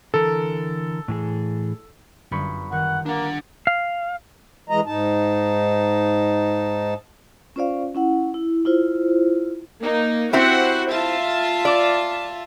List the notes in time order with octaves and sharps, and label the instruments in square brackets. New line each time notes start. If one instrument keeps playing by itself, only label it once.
[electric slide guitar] D3 E3 A#4 [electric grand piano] A4
[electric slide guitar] A2 E3 G#4
[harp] G1 C#7 [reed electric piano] F#2 B5 C#6
[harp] D#3 [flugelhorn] F#5
[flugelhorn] A#3 [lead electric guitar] D4 F#5
[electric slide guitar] F5
[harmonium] E3 G#3 D#5 A#5
G#2 D#4 A5
[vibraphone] C#4 F4 C5 D5 F5
C#4 E4 F#5
E4
E4 F4 C5
[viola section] A#3 D#4
[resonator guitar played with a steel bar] C4 E4 G4 [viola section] F#4 C5 F#5
[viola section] F4 E5 A5
[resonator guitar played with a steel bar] D5